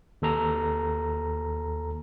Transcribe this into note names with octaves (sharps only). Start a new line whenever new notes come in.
D#2 A4 A#5